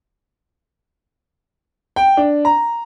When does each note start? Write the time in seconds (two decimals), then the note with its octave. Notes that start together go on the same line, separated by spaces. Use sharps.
1.96 G5
2.17 D4
2.45 A#5